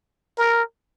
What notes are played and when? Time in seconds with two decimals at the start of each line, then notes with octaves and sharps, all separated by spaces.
0.38 A#4